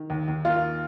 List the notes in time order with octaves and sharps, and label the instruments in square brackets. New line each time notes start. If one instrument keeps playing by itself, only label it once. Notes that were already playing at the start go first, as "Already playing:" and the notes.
Already playing: [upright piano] D#3
D#2
D#2
[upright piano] A#3 [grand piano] F4